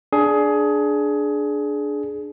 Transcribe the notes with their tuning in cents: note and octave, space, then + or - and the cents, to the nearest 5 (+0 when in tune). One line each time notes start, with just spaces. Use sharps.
D4 +0 G#4 +20